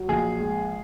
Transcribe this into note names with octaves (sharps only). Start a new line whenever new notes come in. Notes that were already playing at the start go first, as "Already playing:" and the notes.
Already playing: F#3
A#1 G#4
G#3